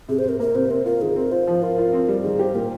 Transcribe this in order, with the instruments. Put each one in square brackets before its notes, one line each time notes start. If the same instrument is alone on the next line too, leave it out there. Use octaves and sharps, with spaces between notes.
[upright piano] C3 [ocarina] G#4
[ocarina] C5
[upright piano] C3 [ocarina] A#4
[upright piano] A#3 [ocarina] A#4
[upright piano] C3 [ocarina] C5
[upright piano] C4 [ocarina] A#4
[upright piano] F4 [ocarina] A#4
[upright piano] D#3 [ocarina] G#4
[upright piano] C4 [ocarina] A#4
[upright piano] F4 [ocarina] C5
[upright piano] F3
[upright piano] F4 [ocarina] A#4
[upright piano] F4
C4
G3
[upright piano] D#3 [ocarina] G#4
[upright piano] G4 [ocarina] C5
[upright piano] A#2 [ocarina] A#4